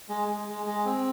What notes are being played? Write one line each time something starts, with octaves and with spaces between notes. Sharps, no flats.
G#3
G#3
G#3
G#3
C4